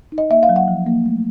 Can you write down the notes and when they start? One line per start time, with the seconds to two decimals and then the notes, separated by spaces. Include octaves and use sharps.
0.12 D#4
0.18 D#5
0.30 A#3 E5
0.43 F5
0.49 F#3
0.56 F#5
0.68 F3
0.86 A#3
1.06 A3